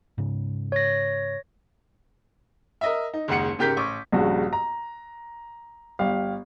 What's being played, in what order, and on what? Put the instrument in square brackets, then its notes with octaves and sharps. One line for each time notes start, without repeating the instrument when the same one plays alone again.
[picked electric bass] G#2 C#3
[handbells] C#5 A#6
[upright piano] A#4 D#5 E5
D#4
F#1 D#2 G#3 F#5 C#7
G#2 C#3 G4 A#4 G6 B6
A1 C#6 D6
A#1 G2 C#3 F#4
A#5
G1 G4 F5